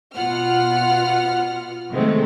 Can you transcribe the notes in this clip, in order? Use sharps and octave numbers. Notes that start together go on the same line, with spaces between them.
B2 F4 F#5 F6
C3 D#3 F#3 G#3 A3 C4